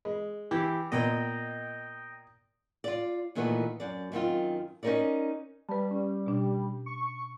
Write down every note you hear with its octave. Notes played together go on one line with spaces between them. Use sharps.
G#3
E3 E4 G4
A#2 B3 D#5 G5
F4 D5
A#2 D#3 E3 A3 B3
F#2 D5
F#2 D#3 C4 F4
C#4 D#4 F4 A#4 C#5 D5
G3 B4 A5
C#4
B2 D4
C#6